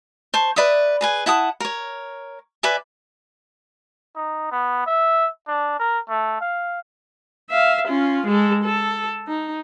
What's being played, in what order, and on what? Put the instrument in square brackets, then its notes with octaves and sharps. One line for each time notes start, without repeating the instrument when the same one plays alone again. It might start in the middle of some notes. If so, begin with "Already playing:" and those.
[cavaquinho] C5 A5 C#6
B4 D5 E5 D#6
G#4 B4 G#5
E4 F#5 A5 D#6
A#4 C#5
B4 D5 E5 G#5
[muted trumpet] D#4
B3
E5
D4
A#4
A3
F5
[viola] E5 F5
C#4 F4
G#3 A4
A4
D#4